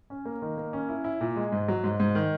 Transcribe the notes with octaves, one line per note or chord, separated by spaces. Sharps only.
C#4
A#3
D#3
A#3
C#4
E4
E4
A#2
G#3
G#2
F#3
G#2
G#2
D#3